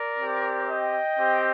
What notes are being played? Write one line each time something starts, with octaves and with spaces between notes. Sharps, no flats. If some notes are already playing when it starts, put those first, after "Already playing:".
Already playing: A#4 D5
C4 G4
D#5 G5
C4 G4